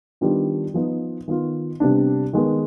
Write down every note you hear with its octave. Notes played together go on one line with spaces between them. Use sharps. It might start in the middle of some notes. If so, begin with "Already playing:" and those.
D#3 G3 B3 D4 F4
F3 B3 D#4
D#3 B3 F4
C3 G3 B3 D4
D#3 G#3 B3